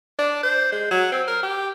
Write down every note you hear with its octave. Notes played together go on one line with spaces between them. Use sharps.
D4
C5
G#3
F#3
C4
A#4
G4